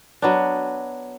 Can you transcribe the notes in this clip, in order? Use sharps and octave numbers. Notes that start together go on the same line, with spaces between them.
F#3 B3 D4